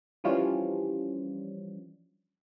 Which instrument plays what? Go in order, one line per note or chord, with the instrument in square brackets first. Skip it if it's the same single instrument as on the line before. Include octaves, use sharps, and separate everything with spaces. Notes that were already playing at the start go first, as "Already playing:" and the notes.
[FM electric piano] E3 F3 G3 C#4 D4 F4